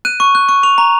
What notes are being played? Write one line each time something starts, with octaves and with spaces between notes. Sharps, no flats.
F#6 D#7
C#6
F#6
C#6
C#6 F7
A#5